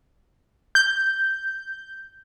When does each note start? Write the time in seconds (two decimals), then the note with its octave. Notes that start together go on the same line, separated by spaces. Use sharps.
0.75 G6